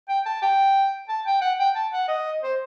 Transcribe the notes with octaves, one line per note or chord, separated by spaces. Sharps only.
G5
A5
G5
A5
G5
F#5
G5
A5
F#5
D#5
C5